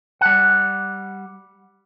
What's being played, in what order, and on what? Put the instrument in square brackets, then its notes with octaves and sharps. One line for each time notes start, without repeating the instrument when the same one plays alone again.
[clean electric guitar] G3 F#5